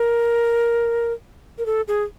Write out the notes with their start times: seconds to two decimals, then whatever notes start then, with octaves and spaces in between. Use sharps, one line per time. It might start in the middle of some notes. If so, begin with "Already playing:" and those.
Already playing: A#4
1.58 A#4
1.66 A4
1.88 G#4